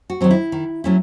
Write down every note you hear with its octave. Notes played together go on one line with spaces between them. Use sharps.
F#4
D#3 F#3 C4
E4
D#3
F#3 A3 C#4 E4